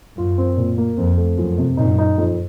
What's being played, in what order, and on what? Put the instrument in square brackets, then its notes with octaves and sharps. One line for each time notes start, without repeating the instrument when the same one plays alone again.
[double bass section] F#2 [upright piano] F4
[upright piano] C4
A#2
A#3
[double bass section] F2 [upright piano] C4
[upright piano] A3
[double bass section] F#2 [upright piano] F3
[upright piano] C3
[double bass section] F#2 A#2 [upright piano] D#4
[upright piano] D#4
F2